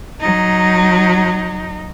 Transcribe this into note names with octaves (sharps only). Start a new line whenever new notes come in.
F#3 D#4